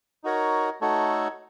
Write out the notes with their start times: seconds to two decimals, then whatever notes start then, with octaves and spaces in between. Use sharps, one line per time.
0.24 D#4 F#4 A#4 C#5
0.81 A3 D#4 F#4 A4 C#5